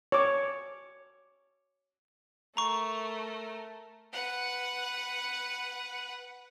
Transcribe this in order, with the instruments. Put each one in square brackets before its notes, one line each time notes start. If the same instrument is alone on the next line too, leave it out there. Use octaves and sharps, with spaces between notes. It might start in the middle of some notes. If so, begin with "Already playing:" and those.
[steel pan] C#5 D6
[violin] A3 A#4 [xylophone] A#5 C#6
[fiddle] B4 F#5